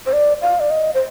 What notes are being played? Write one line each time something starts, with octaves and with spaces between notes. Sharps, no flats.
C5
D5
F5
D5
D#5
C5